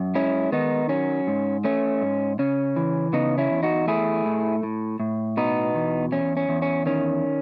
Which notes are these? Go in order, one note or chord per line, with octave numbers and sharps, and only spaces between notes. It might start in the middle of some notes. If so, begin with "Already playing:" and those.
Already playing: F#2
G#3 C#4 E4
D#3 B3 D#4
F#3 C#4
G#2
A3 C#4
G#2
C#3 C#4
E3
C#3 B3 D#4
C#4 E4
E2
D#4 F#4
A3 E4 G#4
A2
A2
A2
B2 B3 D#4
E2
E2 C#4
C#4
E2
C#4
D#3 C#4